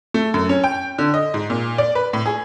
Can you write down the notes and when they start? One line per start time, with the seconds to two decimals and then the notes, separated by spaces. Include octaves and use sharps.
0.14 A3
0.34 F#2
0.49 C#4
0.64 G5
0.98 D3
1.14 D#5
1.34 G#2
1.50 A#2
1.78 D5
1.95 B4
2.13 A2
2.26 G#4